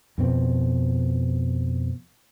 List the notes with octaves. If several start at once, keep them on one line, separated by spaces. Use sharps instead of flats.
F2 B2 C4